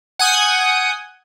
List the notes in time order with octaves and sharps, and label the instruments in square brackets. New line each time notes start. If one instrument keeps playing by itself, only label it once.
[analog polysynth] F#5 G#5 D#6 G6